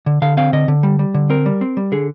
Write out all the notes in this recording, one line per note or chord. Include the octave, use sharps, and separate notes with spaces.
D3
D3 F5
C4 F5
D3 D#5
D3
G3
G3
D3
C4 A#4
G3
C4
G3
D3 G#4